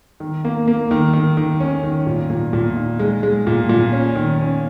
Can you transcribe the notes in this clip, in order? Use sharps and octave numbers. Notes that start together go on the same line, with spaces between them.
D#3
A#3
A#3
D#3
D#3
D#3
C#4
D#3
A#2
A#2
A#2
D#4
G#3
G#3
A#2
A#2
C#4
D#3
C#4